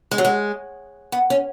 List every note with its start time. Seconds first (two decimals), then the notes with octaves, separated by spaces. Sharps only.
0.11 G#3
0.18 F#3
0.25 G#3
1.12 B3
1.30 C#4